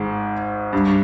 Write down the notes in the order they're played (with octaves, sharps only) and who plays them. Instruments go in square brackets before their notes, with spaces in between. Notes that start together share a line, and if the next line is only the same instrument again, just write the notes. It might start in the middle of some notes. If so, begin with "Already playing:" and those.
Already playing: [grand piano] G#1 G#2
G2